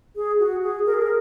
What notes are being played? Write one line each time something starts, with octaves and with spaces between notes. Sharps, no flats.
G#4
F#4
G#4
A#4
G#4
A#4